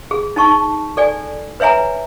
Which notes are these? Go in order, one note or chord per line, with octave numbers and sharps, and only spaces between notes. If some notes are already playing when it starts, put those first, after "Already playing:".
G#4
D#4 A5 C#6
A4 D5 G#5
B4 C#5 E5 G#5 A#5